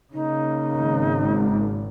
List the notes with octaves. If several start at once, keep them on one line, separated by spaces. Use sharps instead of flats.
C#3 A#3 D#4
G#1